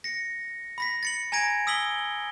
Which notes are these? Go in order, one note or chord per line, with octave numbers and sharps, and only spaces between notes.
A#6 C#7
B5 A#6 B6
A6 C#7 F#7
G#5 A#5 G#6 A#6 D7
D#6 E6 B6 F#7 G7